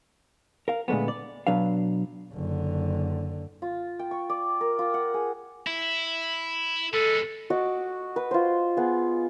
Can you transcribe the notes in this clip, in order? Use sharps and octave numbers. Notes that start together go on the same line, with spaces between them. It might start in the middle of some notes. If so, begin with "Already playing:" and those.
A#4 F5
A#2 D3 G#3 A3 B3
D5
B2 F#3 D4 B4 F5
F#1 D3
F4
G5
C#6
D5
A#4
F4
F#5
G#4
E4
G#3 B3 A4
F#4 D#5 D6
B4
F4 C5
B3 G#4